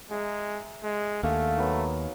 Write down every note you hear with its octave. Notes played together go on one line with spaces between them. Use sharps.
G#3 G#4 E5 A#5
G#3
D#2 D3 A3 G#4 F5
D#3 F#3 B3